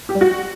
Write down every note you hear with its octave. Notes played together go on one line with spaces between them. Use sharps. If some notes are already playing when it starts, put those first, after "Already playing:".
G4
G3
F#4